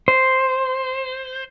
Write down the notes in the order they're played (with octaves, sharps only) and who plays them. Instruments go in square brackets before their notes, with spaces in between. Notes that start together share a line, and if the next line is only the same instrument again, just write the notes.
[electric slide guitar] C5